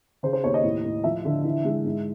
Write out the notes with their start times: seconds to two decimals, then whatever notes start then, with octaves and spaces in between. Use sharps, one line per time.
0.23 C#3 C5
0.33 C5
0.44 D#2 C#5
0.54 D#5
0.63 A2
0.84 A2
1.04 F3 E5
1.25 D3
1.44 E3
1.65 G#3
1.85 G#2